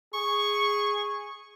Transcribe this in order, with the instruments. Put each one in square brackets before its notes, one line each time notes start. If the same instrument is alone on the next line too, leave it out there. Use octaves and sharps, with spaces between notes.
[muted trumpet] G#4 [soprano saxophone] C#6